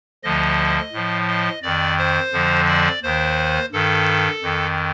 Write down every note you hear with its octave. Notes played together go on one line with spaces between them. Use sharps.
D2 D3 F3 D#5
A2 F3
D#5
F2 D#3 D5
C5
F2 D3 F3
D5
D#2 D#3 C5
G2 D#3 A4
F2 D#3